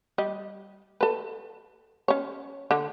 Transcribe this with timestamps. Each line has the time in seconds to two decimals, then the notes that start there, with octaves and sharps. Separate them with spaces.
0.18 G3 D#5
1.01 A4 B4
2.08 C#4 C#5
2.71 D3